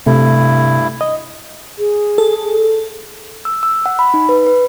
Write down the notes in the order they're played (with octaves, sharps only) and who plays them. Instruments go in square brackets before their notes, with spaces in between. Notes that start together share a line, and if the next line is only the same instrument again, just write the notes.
[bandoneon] G2 E4 [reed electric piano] C3 [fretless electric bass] A3
[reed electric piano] D#5
[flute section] G#4
[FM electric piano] A4
[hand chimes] E6
E6
F#5
B5
D#4
B4
B4